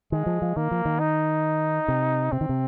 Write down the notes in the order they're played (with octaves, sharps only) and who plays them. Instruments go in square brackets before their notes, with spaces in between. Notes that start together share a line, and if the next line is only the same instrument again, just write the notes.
[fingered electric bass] D#3 [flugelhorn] G#3
[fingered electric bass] F3
F3
[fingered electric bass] D#3 [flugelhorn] A#3
[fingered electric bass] F3
D#3
[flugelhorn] D#4
[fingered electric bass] C3
[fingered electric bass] C3 [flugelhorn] C4
[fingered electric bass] D#3
C3